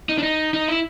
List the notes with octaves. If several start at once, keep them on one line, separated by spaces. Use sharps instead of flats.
D#4
D4
D#4
D#4
E4